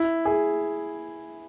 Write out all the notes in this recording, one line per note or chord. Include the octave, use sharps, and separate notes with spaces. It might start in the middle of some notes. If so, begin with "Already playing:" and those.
Already playing: E4
G#4